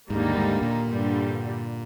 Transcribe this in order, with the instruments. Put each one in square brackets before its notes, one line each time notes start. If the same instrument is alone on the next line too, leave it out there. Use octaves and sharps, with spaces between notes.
[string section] D#2 D3 G3 A#3 D#4 [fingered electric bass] G#2
[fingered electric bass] G#2
A#2
[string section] G2 D3 G3